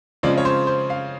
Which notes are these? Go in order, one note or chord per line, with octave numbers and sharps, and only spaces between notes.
C#3 F3 G#3 C4 F4 D5
C#5
C5
C5
F5